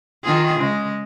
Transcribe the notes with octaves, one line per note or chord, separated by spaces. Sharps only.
D#3 F4 G#4
C#3 G#3